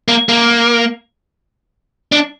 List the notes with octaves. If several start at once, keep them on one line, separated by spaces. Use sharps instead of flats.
A#3
A#3
D4